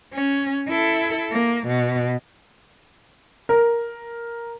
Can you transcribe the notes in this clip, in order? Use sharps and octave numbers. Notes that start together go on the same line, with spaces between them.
C#4
E4 A4
A#3
B2
A#4